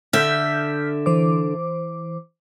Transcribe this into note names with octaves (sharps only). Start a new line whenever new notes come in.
D3 E5 F6 G6 B6
E3 C5 D6